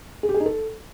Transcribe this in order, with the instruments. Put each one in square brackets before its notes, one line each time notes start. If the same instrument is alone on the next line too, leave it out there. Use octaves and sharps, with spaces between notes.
[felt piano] G#4
G4
G#4
D#4
A4